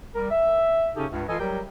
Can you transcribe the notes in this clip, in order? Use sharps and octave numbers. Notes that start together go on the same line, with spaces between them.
G3 A#4
E5
C#3 C#4 D#4 G4 A4
C#2 G2
E3 F4 A4 D#5 G#5
F#3 G3 G4 A#4 G5